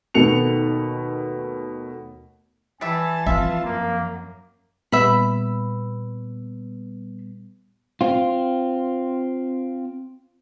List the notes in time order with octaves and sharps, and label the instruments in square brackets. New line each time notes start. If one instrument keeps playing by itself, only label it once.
[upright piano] D#2 B2 A3 C#7 F7
[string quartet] E3 A5 [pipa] G3 E5 [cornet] G#5
[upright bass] F3 C4 [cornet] F4 [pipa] E5
[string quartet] F#2 [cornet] A#3
[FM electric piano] A#2 G3 B3 [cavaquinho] E5 B5
[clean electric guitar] C4 F4